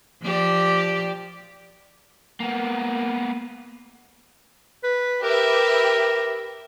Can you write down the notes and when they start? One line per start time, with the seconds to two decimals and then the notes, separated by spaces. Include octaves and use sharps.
0.23 F3 G4 D5
2.40 A#3 B3
4.84 B4
5.23 G4 A#4 B4 E5